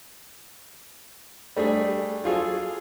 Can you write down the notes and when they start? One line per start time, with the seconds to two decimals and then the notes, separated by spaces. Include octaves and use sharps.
1.56 G3 A3 D4 G#4
2.24 F#3 F4 G#4 A4